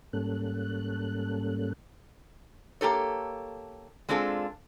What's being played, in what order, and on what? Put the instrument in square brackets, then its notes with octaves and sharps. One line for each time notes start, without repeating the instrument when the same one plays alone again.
[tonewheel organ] G#2 G3 A#3 C#4 A4 F#6
[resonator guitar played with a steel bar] A#3 G4 A4 C#5
G#3 C4 D4 F4 A4